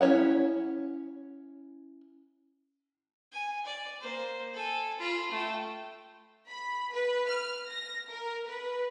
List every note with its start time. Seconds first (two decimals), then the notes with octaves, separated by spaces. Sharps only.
0.01 C#4 E4 C5 C#5 F#5
3.32 G#5
3.65 D5
4.00 A#3 C5
4.53 A4 G#5
4.99 F4 B5
5.31 A3 G5
6.49 B5
6.92 B4
7.28 F6
7.69 A#6
8.09 A#4
8.47 B4